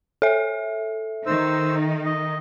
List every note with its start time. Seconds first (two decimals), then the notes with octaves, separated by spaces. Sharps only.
0.22 A4 E5
1.26 D#3 D#4 C5 E6
2.05 D#5